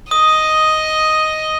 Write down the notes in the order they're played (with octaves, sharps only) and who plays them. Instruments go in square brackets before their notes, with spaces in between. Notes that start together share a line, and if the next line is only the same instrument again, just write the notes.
[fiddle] D#5 [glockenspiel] D#6